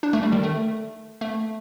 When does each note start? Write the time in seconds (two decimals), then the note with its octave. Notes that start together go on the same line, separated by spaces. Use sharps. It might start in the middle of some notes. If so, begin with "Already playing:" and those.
0.03 D4
0.13 A3
0.23 G3
0.33 D#3
0.43 A3
1.21 A3